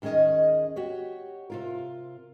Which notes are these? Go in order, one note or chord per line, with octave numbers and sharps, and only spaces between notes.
D#2 D#3 C#4 G#4 D#5
F#4 G4 C#5
C3 F4 A#4